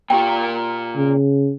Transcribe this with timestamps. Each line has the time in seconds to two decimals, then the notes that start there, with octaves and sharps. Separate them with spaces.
0.10 A#2 F4 G4 G5
0.96 C#3